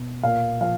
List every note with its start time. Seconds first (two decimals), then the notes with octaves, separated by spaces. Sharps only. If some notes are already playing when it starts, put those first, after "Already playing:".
Already playing: B2
0.23 A#2 F5
0.61 F3 F5